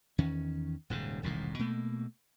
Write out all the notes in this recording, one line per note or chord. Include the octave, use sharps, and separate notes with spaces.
E2 D#3 C#4
D#1 G#2 C#3
E1 C2 A2 D#3
B2 A3 A#3